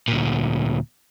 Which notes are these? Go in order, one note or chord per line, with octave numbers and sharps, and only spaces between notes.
D2 A#2